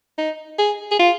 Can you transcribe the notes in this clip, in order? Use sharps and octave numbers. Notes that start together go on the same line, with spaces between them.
D#4
G#4
G#4
F4